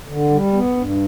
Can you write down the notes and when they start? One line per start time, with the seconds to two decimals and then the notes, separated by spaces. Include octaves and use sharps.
0.07 D3
0.30 G3
0.53 B3
0.77 G2